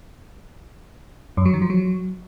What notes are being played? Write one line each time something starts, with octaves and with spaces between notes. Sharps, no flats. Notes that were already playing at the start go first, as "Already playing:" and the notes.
F#2
F#3
D#3
F3
F#3